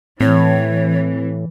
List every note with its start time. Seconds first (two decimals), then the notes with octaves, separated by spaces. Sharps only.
0.20 A2 E3 C4 C#5